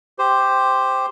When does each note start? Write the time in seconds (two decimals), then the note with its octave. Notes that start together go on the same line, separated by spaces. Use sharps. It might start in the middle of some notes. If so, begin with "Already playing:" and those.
0.19 G4 C5